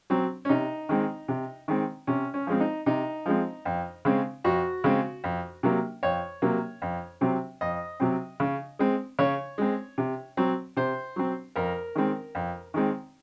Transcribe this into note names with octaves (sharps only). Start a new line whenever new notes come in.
F#3 C4
C#4
C3 D#4
D#3 G#3 C4
C3
D#3 G#3 C4
C3 C#4
C#4
F3 G#3 C4
D#4
C3 D#4
F3 G#3 C4
F2
C#3 G#3 C4
F2 F#4
C#3 G#3 C4
F2
C3 F#3 A#3
F2 C#5
C3 F#3 A#3
F2
C3 F#3 C4
F2 D#5
C3 F#3 C4
C#3
G#3 C4
C#3 C#5
G#3 C4
C3
F#3 C4
C3 C5
F#3 C4
F2 A#4
D#3 G#3 C4
F2
D#3 G#3 C4